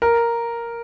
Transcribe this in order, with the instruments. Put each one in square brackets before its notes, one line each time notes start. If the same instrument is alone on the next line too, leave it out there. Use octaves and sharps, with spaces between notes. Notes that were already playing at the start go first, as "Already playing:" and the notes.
[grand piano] A#4